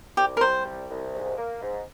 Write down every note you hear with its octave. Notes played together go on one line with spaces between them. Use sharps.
C2 G4
A#4
G3 C5
C2
C2
G#2
A#3
G#2